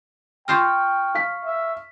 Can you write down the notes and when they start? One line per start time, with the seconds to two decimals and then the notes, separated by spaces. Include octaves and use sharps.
0.48 F4 C5 D#5 G5 C#6 F6
1.15 F5 B6
1.45 E5